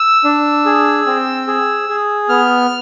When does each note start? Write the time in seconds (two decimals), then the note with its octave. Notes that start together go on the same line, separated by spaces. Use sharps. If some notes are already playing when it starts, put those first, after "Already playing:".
Already playing: E6
0.24 D4
0.66 G#4
1.07 C4
1.47 G#4
1.89 G#4
2.29 B3 F6